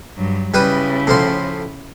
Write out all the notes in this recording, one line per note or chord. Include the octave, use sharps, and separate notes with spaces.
G2 F#3
C#3 G3 E4 B4 D#6
A2 F3 C6